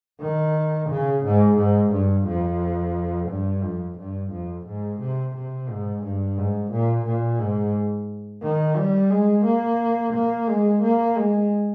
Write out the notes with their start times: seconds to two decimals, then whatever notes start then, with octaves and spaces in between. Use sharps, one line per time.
0.21 D#3
0.90 C#3
1.25 G#2
1.58 G#2
1.92 G2
2.27 F2
3.29 G2
3.63 F2
3.98 G2
4.31 F2
4.66 G#2
5.00 C3
5.35 C3
5.69 G#2
6.03 G2
6.37 G#2
6.72 A#2
7.06 A#2
7.39 G#2
8.43 D#3
8.77 G3
9.10 G#3
9.45 A#3
10.14 A#3
10.48 G#3
10.83 A#3
11.16 G#3